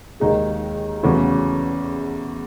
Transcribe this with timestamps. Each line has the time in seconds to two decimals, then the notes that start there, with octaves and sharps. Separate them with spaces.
0.20 D#2 D#3 G#3 D#4 G#4
1.03 E2 C#3 F#3 A3 E4